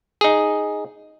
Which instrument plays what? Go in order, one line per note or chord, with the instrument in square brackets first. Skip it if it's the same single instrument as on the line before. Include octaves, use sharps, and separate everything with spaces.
[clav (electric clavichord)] D#4 G#4